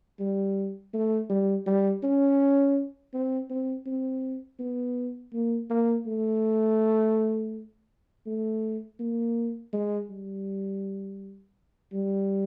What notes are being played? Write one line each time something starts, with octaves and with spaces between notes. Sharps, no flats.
G3
A3
G3
G3
C#4
C4
C4
C4
B3
A#3
A#3
A3
A3
A#3
G#3
G3
G3